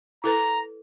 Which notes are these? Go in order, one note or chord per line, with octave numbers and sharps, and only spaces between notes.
E4 A4 B4 A#5